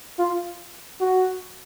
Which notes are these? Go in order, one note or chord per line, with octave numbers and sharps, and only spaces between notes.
F4
F#4